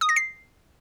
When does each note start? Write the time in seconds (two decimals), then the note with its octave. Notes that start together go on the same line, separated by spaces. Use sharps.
0.01 D#6
0.09 A#6
0.16 C7